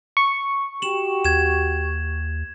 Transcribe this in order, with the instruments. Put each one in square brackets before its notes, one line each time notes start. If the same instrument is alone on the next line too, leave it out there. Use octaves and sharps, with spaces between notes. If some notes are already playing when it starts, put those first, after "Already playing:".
[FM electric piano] C#6
[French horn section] F#4 G4 [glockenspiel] E7 F#7
[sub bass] D#2 [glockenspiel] G#6 E7